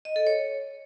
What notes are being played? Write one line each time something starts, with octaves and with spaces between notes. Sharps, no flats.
D#5
A4
C#5